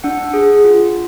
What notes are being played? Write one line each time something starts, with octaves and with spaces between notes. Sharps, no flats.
D4 F#5
G#4
F4